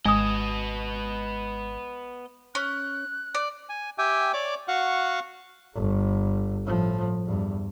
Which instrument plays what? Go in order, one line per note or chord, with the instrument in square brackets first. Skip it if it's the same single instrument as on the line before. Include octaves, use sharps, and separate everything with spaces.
[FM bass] G#1 [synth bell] G#3 [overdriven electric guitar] B3 D#5 [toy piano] G#5 D#6
[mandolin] C#4 [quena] F#6
[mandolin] D5
[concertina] G#5
G4 E5 G5 G#5
C#5 D5 D6
F#4 F5 F#5 C#6
[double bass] G1
A2 F3
E2 G2